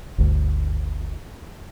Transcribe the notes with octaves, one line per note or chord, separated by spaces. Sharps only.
G1 D2